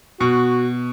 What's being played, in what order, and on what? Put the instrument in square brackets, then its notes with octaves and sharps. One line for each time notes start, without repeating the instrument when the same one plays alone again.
[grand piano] B2 [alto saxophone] F#4